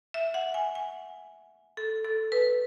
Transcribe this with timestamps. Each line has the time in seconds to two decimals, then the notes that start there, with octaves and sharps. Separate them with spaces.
0.14 E5
0.34 F#5
0.54 G#5
0.75 G#5
1.77 A4
2.04 A4
2.32 B4